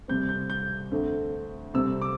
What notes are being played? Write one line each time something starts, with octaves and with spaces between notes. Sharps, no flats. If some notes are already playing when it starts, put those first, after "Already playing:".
C2 C3 G3 C4 G6
G6
G6
D2 D3 C4
C2 C3 G3 C4 E6
D6